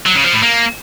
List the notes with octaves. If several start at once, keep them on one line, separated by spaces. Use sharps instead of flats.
F#3
C#3
F3
A2
A#3